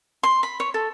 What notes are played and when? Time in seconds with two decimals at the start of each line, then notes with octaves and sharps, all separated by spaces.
0.23 C6
0.43 B5
0.60 C#5
0.74 A4